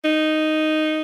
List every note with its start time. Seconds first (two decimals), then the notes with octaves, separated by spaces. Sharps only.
0.05 D#4